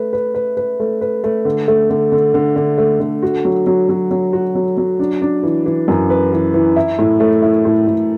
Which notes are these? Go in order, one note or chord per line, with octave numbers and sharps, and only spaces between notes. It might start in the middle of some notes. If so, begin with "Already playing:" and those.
Already playing: A3 B4
B4
B4
B4
A3
B4
A3
D3
A3
D3
D3
D3
D3
A3
D3
F#4
F#3
F#3
F#3
F#3
F#4
F#3
F#3
D4
D4
E3
E3
F#2
B4
E3
E3
E4
A2
A3
E4
A2
A2